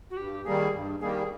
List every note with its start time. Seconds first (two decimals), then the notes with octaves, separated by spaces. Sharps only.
0.10 F#4
0.17 G2 G4
0.45 D#3 G3 A#3 G#4
0.73 G2
1.01 D#3 G3 A#3 G#4
1.09 G4
1.18 G#4